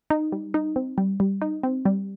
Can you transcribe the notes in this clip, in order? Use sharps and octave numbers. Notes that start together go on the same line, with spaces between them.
D#4
G3
D#4
C4
G3
G3
D#4
C4
G3